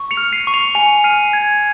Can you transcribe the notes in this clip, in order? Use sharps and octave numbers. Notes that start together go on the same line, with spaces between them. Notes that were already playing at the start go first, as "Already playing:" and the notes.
Already playing: C#6
C#7 F7
F6
C7 D#7
C#6
C#7 F7
G#5 C#7 F7
F6 C7 D#7
G#5 G#6